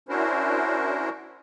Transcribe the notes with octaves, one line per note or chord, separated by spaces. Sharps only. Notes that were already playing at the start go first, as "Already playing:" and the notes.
C#4 D4 E4 F#4 A#4 C5